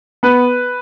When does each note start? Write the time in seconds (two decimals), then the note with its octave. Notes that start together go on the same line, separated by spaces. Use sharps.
0.23 B3 B4